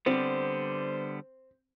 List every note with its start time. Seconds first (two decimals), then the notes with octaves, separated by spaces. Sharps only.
0.06 D3 G3 B3 C4 C5